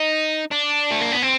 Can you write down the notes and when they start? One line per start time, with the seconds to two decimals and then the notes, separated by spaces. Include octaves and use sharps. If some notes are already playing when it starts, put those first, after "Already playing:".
Already playing: D#4
0.51 D4
0.90 A3
1.01 A#3
1.12 B3
1.22 C4